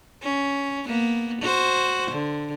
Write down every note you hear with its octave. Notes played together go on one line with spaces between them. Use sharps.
C#4
A#3 B3
F#4 C5
D3